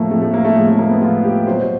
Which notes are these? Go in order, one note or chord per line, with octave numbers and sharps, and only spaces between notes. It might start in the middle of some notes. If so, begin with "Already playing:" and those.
Already playing: A2 F3 A3 A#3
A2 F3 A3
A3
A#3
A3
A2 F3 G#3
A3
A#3
B3
A2 F3 F4
G4
B2 F#3 C5
C5